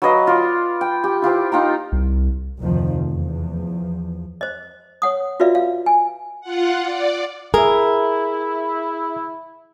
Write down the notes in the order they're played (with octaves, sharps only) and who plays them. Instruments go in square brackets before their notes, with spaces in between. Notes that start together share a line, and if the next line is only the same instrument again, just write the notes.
[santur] F#3 B4 D#5 F5
F4 D5
G5
G4
E4 F4 G4 C5
D#4 F4 G5 A#5
[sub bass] C2
[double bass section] F1 D2 D#3 F3
E2 F3
[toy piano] C5 D#5
C#5 F#5 D#6
F4 F#4 B4 D5 E5 F5
F5
G#5
[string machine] F4 F#5
D5
[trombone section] E4 [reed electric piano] G#4 E5 [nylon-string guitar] A#4